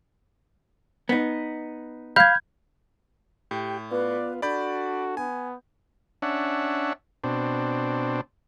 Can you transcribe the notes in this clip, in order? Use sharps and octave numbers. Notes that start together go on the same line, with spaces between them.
B3 D#4
F5 B5 F6 G6 G#6
A2 G4 G5
B3 F4 B4 D5
D4 F#4 A4 D5 B5 G6
B3 G#5
C#4 D4 E5 F#5
B2 C4 D4